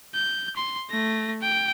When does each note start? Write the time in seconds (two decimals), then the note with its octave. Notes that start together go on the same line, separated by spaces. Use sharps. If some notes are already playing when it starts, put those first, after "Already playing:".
0.14 G6
0.56 C6
0.90 A3 A#6
1.41 G5